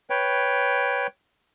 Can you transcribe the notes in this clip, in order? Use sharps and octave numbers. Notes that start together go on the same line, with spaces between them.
B4 C#5 G5